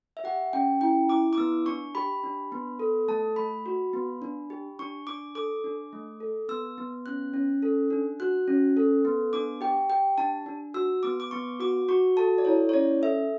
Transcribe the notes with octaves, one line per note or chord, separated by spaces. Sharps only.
E5
G4 F#5
C#4 G5
E4 G5
E4 D6
D6
B3 E6
D4 C#6
G4 B5
D4
B3
A4
A3 A5
A3 B5
F#4
B3
D4
G4
D4 C#6
D4 D6
A4 D6
D4
A3
A4
B3 E6
B3
C#4 F#6
C#4
A4
D4
F#4 F#6
C#4
A4
B3
D4 D6
G4 G5
G4 G5
D4 A5
D4
F#4 E6
B3 D6
D6
B3 C#6
F#4 D6
F#4 C#6
A4 A5
D5
E4 C#5
C#5
C#4 D5
A4 E5